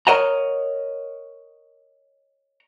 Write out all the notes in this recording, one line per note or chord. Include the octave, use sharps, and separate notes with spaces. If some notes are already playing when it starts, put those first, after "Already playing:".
A#4 C#5 D#5 F#5 A#5